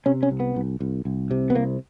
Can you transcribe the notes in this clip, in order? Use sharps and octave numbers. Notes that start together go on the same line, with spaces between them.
C3 C#4
C#4
C2
B3
C2
C2
C2
C3
B3
C2 A#3